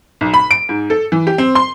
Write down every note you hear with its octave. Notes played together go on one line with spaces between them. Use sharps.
B1
B5
D7
G#2
A4
E3
G4
C4
C6